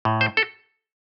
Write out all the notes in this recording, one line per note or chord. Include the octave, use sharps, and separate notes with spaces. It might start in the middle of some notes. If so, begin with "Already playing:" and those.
A2
C5
A4